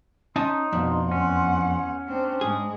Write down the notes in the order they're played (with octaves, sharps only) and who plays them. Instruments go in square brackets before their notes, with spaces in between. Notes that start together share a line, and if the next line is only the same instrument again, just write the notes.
[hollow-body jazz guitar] C#4 D#5 A5 [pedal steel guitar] D#4 [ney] C6
[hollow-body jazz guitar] F2 D4 [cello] B2
[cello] E2 F#5 [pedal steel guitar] C#4
[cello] C4 [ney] D4
[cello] G#2 G#3 [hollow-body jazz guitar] G#4